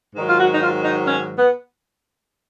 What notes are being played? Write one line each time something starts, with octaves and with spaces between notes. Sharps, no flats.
G#2 D#3 F#3
F4
F#4
D#4
F4
D#4
C#4
B3